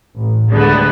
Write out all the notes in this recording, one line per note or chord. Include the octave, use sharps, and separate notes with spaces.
A1
D2 D3 G3 G#3 B3